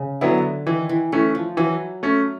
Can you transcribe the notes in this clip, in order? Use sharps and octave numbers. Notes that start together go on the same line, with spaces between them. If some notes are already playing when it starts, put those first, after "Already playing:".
Already playing: C#3
D3 F#3 B3 E4
D#3 E3
E3
E3 A3 C#4
F3
E3 F#3
A3 C#4